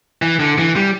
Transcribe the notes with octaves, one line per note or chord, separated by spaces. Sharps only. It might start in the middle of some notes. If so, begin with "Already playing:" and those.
E3
D3
E3
G3